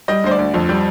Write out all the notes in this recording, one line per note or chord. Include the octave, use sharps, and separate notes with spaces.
G3 D#5
D2 C5
D5
D2
F2
G3